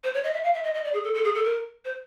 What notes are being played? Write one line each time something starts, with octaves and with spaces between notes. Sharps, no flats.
C5
C#5
D#5
E5
F5
E5
D#5
D#5
D5
G#4
A4
A4
G#4
A4
A#4
C5